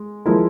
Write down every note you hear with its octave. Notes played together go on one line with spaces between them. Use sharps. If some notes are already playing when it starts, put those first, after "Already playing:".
Already playing: G#3
F3 G#3 E4 A#4